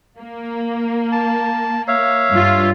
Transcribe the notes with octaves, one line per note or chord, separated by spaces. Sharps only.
A#3
A5
C#5 E5 F5
G2 F4